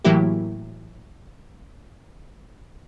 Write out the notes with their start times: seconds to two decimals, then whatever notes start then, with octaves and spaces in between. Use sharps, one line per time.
0.04 A2 E3 F#3 A#3 E4 G4